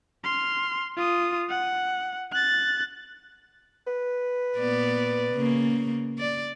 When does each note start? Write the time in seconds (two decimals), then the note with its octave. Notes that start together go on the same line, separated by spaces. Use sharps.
0.24 C6 F6
0.97 F4 D#6
1.49 F#5
2.32 F#6 A6
3.87 B4
4.59 A#2 B3 D5
5.34 C#3 A#3
6.19 D5